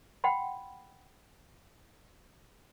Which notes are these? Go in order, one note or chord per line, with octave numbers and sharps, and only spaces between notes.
F#5 G5 B5 C6